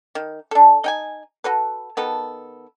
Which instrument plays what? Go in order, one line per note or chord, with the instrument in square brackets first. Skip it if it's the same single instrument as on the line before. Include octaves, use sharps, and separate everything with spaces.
[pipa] D#3
D4 A4
D#4 G5 G#5
F#4 A4 B4
D#3 B3 A4